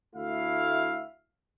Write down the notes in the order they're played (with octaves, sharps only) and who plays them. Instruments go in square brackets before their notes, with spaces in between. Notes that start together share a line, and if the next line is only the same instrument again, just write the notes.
[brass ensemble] D2 A3 E4 E5 F5